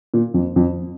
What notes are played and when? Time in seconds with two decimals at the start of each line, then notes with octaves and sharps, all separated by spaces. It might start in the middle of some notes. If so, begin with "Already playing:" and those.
0.14 A#2
0.34 F2
0.56 F2